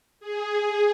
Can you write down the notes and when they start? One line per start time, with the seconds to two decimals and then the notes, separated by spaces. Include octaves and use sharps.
0.20 G#4
0.57 G#4